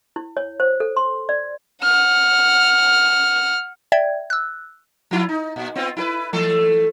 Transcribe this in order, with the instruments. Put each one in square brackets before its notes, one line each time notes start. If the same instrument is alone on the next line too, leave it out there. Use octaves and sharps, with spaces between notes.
[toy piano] E4
C#5
C5
A4
C6
D5
[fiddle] F#5 F6
[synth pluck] D5 E5 G5 G#6
E6 F#6
[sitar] F3 E4 F4
D#4
A#2
B3 C4 F4
E4 F#4 B4
E3 A3 A4